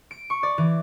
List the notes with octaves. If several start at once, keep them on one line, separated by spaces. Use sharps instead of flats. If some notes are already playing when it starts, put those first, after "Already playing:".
D7
C#6
D5
E3